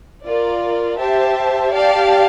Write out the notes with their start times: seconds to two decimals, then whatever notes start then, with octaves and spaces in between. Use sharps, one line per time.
0.24 F4 A#4 D5
0.99 G4 C5 E5 A5
1.73 G4 D5 F5 A5